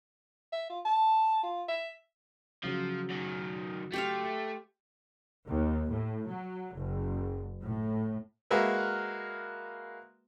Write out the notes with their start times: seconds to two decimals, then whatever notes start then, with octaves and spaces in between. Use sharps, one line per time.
0.52 E5
0.69 F4
0.85 A5
1.43 F4
1.68 E5
2.63 C#3 F3 F#3
3.10 F#2 D#3
3.93 A3 G4 C5 F5
5.46 D#2
5.90 A2
6.29 F#3
6.75 F#1
7.62 A2
8.51 G#3 A#3 F#4 A#4 B4 E5